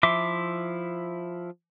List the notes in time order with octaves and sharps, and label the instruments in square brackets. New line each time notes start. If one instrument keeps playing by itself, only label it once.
[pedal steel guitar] F3 E4 E5 C6 D6